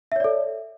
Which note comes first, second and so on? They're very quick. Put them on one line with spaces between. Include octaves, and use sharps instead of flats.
E5 C#5 D5 A4